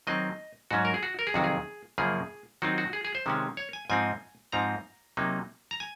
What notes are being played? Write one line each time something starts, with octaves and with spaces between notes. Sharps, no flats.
D#3 F#3 C4 D#5
G#2 F#3 C#4 F#4
A#4
G#4
F#4
A#4
G#4
F2 C3 D#3 F#3 F#4
G#4
F#2 C#3 F3 A#3 G#4
D#3 F#3 C4 D#4 F#4
F#4
G#4
G#4
C5
C3 D#3 G#3 C#4
C#5
G#5
G#2 F3 C4 D#4 G#5
G#2 F3 C4 D#4 A#5
C3 F#3 A#3 D#4
A#5
G#5